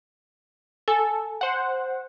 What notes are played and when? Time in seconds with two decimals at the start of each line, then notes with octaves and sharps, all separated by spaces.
0.88 A4 G#5
1.41 C5 F#5